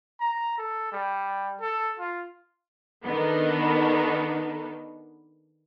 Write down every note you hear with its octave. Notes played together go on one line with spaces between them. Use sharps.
A#5
A4
G3
A4
F4
D#3 B3 D4 D#4 A4